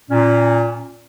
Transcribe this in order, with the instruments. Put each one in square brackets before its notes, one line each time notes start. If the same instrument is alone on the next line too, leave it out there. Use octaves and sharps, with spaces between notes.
[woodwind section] A#2 C#4